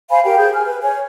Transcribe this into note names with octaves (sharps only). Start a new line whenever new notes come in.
C5 F5 G#5 B5
G4 A#4 G5
G#4 C5 G6
G#5 F6
B4
C#5 G#5